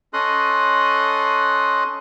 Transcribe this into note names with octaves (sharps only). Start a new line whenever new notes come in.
C#4 A4 D#5 C6 D#6 F#6